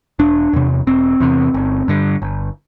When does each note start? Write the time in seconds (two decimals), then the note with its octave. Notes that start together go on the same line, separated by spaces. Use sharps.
0.19 E1 D4
0.53 E2 C3
0.87 E1 C4
1.20 E2 C3
1.54 G1
1.88 G2 D3
2.22 G1